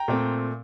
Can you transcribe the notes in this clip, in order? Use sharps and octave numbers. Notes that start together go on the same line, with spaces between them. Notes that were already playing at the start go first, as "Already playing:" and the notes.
Already playing: G5 A#5
A#2 A3 C4